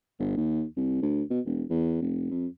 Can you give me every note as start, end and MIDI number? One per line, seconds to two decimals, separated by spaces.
0.20 0.32 31
0.37 0.64 39
0.77 0.99 36
1.02 1.23 38
1.30 1.40 47
1.46 1.64 28
1.70 1.97 40
2.02 2.28 29
2.31 2.47 41